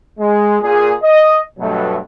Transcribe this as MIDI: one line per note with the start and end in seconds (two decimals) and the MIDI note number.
0.19 0.57 56
0.62 0.93 46
0.62 0.93 68
1.03 1.37 75
1.59 1.97 43
1.59 1.97 47
1.59 1.97 54
1.59 1.97 57